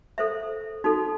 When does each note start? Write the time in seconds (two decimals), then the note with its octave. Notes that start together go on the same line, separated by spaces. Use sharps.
0.18 A4 C5 E5
0.84 D#4 F#4 A4